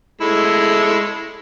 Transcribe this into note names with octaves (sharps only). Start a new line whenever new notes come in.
G#3 A3 E4